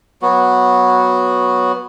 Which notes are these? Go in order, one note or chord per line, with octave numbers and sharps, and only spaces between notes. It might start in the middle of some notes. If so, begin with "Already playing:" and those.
F#3 B3 F#4